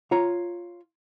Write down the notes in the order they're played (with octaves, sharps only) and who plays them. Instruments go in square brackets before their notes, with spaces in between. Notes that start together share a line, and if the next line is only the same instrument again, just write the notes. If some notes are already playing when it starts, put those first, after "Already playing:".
[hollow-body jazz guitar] F4 C#5 A#5